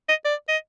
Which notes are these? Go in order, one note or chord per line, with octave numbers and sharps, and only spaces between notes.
D#5
D5
D#5